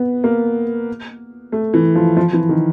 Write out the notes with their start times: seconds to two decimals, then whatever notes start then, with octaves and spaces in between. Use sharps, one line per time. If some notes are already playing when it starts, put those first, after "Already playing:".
Already playing: B3
0.24 A#3
1.52 A3
1.74 E3
1.95 F3
2.17 F3
2.33 E3
2.49 D#3